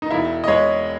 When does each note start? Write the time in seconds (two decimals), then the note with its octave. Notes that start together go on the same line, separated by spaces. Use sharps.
0.02 D#4
0.11 E1 E4
0.44 D#5
0.48 G#3 C#5